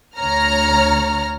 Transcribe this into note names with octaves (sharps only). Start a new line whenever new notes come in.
D2 C#5 A#5 F6